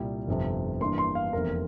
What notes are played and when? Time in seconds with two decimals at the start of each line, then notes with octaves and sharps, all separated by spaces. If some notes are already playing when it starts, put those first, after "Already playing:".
Already playing: C2 A#2 G3
0.27 G1 F2 C3
0.81 G2 E3 A#3 D4 C6
0.98 C6
1.15 F5
1.33 F1 E2 C3 A#4